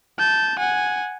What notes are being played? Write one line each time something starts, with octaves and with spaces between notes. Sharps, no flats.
A5 G6
F#5 G#5